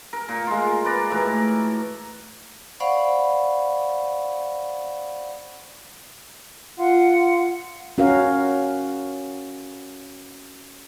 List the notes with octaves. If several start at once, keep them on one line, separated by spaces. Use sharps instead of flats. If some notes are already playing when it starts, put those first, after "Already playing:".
A#4
A#2
G#3 F4
B4 D5 A#5
A2 E3 F#4 A#4
C5 D5 F5 F#5 B5 C#6
F4 F#5
C#4 F#4 A#4 F5